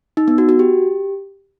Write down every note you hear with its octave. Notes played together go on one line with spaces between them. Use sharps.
D#4
B3
F#4
F#4
G4